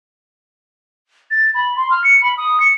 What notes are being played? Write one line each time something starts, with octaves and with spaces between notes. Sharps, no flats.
A6
B5
C6
F6
C#7
B5
D#6
C#7